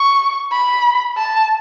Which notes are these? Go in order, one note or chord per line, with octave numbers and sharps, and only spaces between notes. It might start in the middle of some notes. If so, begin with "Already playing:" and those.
Already playing: C#6
B5
A5